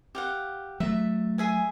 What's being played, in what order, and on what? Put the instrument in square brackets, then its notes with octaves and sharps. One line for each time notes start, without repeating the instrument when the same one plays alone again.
[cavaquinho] G4 F5 F#5
[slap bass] F#3 A3 [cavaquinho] E5
[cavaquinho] G#4 E5 G#5